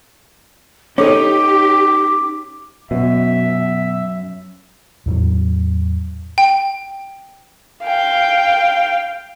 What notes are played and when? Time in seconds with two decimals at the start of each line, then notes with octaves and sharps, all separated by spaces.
0.98 C#4 D#4 G4 A4 C#5 D6
2.91 F#2 B2 E5
5.06 E2 A2 F#3
6.38 G5
7.85 F5 G5